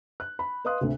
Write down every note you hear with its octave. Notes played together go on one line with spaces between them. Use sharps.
F#6
B5
B4 D#5 F5 C6 D#6 F#6
D2 C3